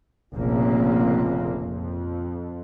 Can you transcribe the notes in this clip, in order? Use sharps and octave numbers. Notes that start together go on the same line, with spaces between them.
F1 A#1 F2 C#3 A#3
F2